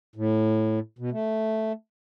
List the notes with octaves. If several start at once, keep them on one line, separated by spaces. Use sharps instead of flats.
A2
B2
A3